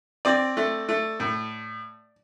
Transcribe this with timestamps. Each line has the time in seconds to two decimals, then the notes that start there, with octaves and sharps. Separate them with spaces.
0.25 C4 D5
0.57 A3
0.89 A3
1.20 A2